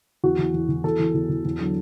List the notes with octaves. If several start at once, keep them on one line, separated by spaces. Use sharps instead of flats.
E2 F#4
E3
E2
E3
E2 A4
E3
E2
E3
E2
D3 F#3